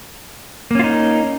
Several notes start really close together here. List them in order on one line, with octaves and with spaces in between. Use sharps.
A#3 C#4 F4 D#4